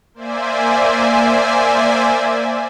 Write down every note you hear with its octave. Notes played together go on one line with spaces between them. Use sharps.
A#3 C5 D5 E5 G#5